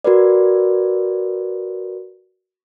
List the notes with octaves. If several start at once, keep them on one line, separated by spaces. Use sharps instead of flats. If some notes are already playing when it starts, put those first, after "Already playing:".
F#4 A#4 B4 D5